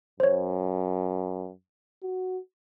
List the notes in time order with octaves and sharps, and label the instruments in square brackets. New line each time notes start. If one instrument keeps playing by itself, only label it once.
[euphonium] F#2 [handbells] C5 C#5
[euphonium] F#4